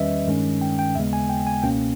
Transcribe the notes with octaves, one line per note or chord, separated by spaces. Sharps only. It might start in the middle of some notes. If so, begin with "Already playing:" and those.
Already playing: E2 D#3 G3 C#4 B4 D#5 E5
G2 D#3 G#3 C#4
G5
G5
D#2 C#3 G#3 B3 E5
G#5
G5
G#5
C#2 B2 A#3 C#4 G5